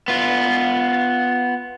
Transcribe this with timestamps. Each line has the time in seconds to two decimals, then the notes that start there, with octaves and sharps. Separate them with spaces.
0.08 B3 F4